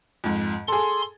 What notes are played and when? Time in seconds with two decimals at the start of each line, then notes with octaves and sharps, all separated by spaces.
0.24 F2 G#2
0.68 G#4 A4 C6